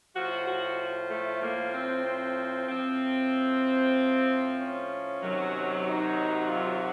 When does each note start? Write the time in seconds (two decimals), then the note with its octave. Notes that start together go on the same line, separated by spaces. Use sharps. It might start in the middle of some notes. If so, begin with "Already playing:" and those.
0.15 A2 F3 F#4
0.46 F#4
1.10 A3
1.41 A#3
1.73 C4
2.04 C4
2.68 A2 F3 C4
4.58 C#4
5.21 C3 D#3 F#3
5.84 D#4
6.47 F4